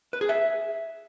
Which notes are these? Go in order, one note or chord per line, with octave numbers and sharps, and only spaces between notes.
B4
G#4
E5